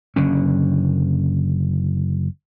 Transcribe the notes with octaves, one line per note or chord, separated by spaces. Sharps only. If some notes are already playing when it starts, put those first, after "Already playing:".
F#1 D3 C#4